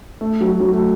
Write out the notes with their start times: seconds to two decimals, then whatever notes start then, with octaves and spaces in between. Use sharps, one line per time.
0.21 A3
0.41 F#3
0.60 F#3
0.73 A3